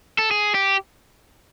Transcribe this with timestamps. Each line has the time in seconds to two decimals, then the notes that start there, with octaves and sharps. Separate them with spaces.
0.18 A4
0.31 G#4
0.55 G4